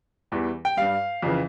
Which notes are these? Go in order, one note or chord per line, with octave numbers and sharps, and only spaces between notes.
E2 E3 G3
G5
G2 G3 F5
F2 C#3 E3